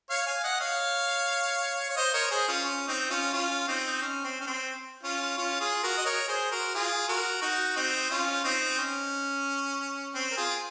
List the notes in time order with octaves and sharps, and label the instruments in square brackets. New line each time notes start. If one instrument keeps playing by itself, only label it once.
[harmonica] C#5 F5
F5 G#5
D#5 F#5
C#5 F5
C#5
C5 D#5
A#4 C#5
G#4 C5
C#4 F4
C#4
C4 D#4
C#4 F4
C#4 F4
C4 D#4
C#4
C4
C#4
C4
C#4 F4
C#4 F4
F4 G#4
F#4 A#4
D#5
A#4 C#5
G#4 C5
F#4 A#4
F4 G#4
F#4 A#4
D#4 F#4
C4 D#4
C#4 F4
C4 D#4
C#4
C4
A#4
F4 G#4